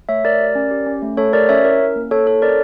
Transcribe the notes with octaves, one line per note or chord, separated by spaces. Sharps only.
A3 C#5 E5
A3 A#4 D5
G4
C#4
G4
C#4
A3
A3 A4 C#5
G4 A#4 D5
C#4 C#5 E5
E4 A#4
C#4
A#3
A#3 A4 C#5
E4 A4 C#5
C#4 A#4 D5